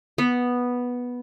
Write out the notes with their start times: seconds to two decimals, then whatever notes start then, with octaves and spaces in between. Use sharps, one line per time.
0.18 B3